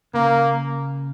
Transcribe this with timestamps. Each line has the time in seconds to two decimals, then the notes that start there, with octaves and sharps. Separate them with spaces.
0.14 C#3 A#3